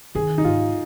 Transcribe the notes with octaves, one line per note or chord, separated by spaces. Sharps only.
D#3 G#4
D#4
G#2 F4